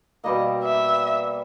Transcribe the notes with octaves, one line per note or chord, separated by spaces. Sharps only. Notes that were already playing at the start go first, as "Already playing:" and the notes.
B2 G3 A#3 D#5
E5